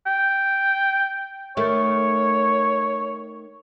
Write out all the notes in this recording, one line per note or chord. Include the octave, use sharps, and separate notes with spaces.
G5
D#3 A3 C#5